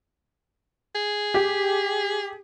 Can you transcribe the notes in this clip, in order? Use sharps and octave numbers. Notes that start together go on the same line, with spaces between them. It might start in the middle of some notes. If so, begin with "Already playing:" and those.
G#4
G4